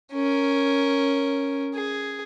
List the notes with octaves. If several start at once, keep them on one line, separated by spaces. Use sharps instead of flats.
C#4 A#4
G#4